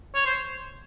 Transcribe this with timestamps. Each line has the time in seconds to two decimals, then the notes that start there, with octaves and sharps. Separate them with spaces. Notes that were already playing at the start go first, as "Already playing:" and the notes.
0.15 C#5
0.26 C5